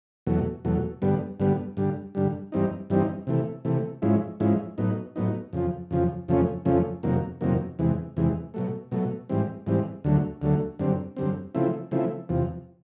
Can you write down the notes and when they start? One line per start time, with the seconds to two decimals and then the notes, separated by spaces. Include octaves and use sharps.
0.27 E2 B2 F#3 A3
0.65 E2 B2 F#3 A3
1.02 G2 D3 G3 B3
1.40 G2 D3 G3 B3
1.77 G2 D3 G3
2.15 G2 D3 G3
2.52 G2 E3 G3 C4 D#4
2.90 G2 E3 G3 C4 D#4
3.27 C3 E3 A3
3.65 C3 E3 A3
4.02 G#2 F3 G#3 C#4 E4
4.40 G#2 F3 G#3 C#4 E4
4.78 A2 F#3 B3 D#4
5.16 A2 F#3 B3 D#4
5.53 F2 C#3 F3
5.91 F2 C#3 F3
6.28 F2 C#3 F3 A3 C#4
6.65 F2 C#3 F3 A3 C#4
7.03 F2 C3 D#3 F#3 A#3
7.41 F2 C3 D#3 F#3 A#3
7.79 E2 C3 E3 G#3
8.17 E2 C3 E3 G#3
8.54 B2 F#3 A3
8.92 B2 F#3 A3
9.29 G#2 E3 G3 C4
9.66 G#2 E3 G3 C4
10.04 D2 D3 F#3 A3
10.42 D2 D3 F#3 A3
10.79 F#2 D3 G3 C4
11.17 F#2 D3 G3 C4
11.55 C#3 F3 A3 C4 E4
11.91 C#3 F3 A3 C4 E4
12.29 E2 C3 F3